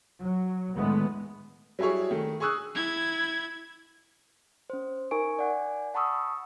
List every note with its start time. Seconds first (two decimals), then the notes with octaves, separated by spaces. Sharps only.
0.22 F#3
0.76 A2 D3 D#3 G#3 A3 B3
1.79 F#3 G3 E4 G#4 C#5
2.11 D#3 A3
2.40 G#4 G#5 C#6 D#6 E6 F#6
2.75 E4 G#6
4.70 C#4 C5
5.11 D#4 A#4 G#5 C#6 D7
5.39 D5 F#5 G#5
5.94 F#5 A5 B5 C#6 D#6 E6